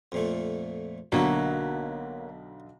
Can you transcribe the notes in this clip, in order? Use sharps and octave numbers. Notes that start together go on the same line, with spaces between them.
F2 A#2 A3
B1 D3 F#3 A#3 E4 G4